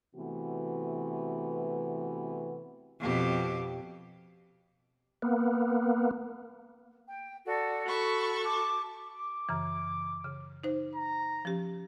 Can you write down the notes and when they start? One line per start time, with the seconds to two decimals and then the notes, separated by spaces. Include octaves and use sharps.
0.15 C3 E3 A3 B3 F#4
3.00 F2 B2 G4
5.22 A#3 B3
7.05 G5
7.45 F#4 A4 D5
7.85 F#4 A4 B5 C#6
8.43 A5 D6
9.07 D6
9.49 F#2 C#3 E3
10.24 C#3
10.63 D#4 C5
10.95 A#5
11.45 F3 C#4 G4